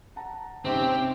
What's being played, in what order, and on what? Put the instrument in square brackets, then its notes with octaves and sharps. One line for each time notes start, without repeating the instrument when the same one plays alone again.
[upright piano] F#5 A5 A#5
[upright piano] G#2 C3 C#4 [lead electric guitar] C4 [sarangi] G4 [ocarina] C5